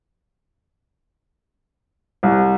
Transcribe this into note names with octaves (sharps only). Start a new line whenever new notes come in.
C2